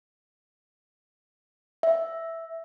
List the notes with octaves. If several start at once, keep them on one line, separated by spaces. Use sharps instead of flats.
E5